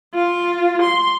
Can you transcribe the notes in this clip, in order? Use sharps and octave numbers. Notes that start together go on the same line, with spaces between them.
F4
C6